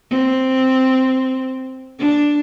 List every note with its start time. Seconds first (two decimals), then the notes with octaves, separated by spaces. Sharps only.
0.10 C4
1.99 D4